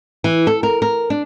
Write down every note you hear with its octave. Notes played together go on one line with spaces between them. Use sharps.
E3
A4
A#4
A#4
D4